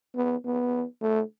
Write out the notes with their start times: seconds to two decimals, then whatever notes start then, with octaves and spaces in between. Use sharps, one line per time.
0.16 B3
0.45 B3
1.01 A3